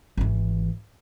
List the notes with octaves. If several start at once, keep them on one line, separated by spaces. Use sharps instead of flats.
G#1 E3